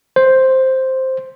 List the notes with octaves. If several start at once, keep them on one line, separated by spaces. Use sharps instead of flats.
C5